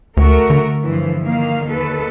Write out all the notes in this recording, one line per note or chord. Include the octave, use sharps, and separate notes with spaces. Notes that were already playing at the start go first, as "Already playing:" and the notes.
D2 A3 F#4 A#4
D3
G2 E3 F3
D#3 A#3 F5
D#2 A4 B4